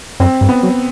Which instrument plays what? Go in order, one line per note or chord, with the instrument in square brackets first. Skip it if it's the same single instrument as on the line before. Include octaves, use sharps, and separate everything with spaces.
[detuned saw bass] F#2 [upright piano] C4
[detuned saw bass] G2
[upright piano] B3
[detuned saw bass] F#3